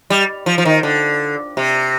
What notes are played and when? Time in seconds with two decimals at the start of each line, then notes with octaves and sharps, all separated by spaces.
0.10 G3
0.46 F3
0.58 F3
0.65 D#3
0.83 D3
1.57 C3